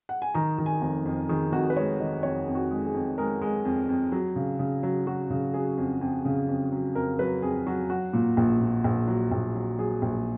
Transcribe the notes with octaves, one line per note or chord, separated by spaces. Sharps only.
F#5
G#5
D#3 A#5
D#3
G#5
F1
F2
D#3 G#4
F1 F#4
B4
G#3 C#5
D#3 D#5
F2 C#5
F2
F#4
G#3
G#4
F2
G#3 A#4
G#3
F2
F2
F#3
C#3
C#3
F#3
F#3 F#4
C#3
F#3 G#4
F2
F2
C#3
F2
F#3
F2 A#4
F#3 B4
F2 G#4
F#3 F#4
F#3 F#4
A#2
A#1
A#2
A#1
F#3
A#1
F#3
F#3 G#4
A#1